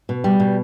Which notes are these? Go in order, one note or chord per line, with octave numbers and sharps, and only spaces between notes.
B2
G3
B2